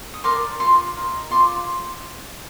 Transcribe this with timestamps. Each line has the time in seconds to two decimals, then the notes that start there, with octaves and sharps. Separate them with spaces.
0.14 D#6
0.24 A#4 D5 C6 D6
0.60 F4 C6 D6
0.96 A#4 D#5
1.31 F4 C6 D6